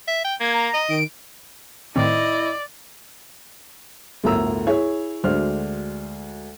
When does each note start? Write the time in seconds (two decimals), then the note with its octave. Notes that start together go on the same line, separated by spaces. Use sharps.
0.07 E5
0.25 G5
0.40 A#3 G#6
0.53 A#5
0.74 D#5
0.88 D#3 D7
1.96 A2 D#3 C4 E4 D5 D#5
4.24 G1 D2 A2 A#4 A#5 E6
4.67 E4 G#4 C#5
5.24 D2 G#3 D4 F#4 C5 F6